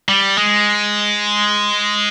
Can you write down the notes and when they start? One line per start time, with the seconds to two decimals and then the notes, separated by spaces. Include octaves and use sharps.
0.09 G3
0.37 G#3